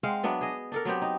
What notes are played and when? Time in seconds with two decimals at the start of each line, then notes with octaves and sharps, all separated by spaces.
0.03 G#3 C4 F5 F#5
0.23 F#3 B3 D4 E5
0.41 G#4 D#5
0.72 D4 A4 A#4
0.85 F#3 B3 C4 G4
1.02 D#4